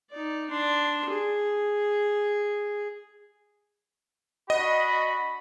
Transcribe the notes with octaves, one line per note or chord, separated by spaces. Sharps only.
D#4 D5
D4 C6
G#4
D4 F#4 D#5 B5